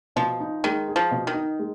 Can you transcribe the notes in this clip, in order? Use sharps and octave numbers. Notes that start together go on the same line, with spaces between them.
B2 F3
D#4
D#3 G#3
G#4
F3
B2
D#3
D#4
G#3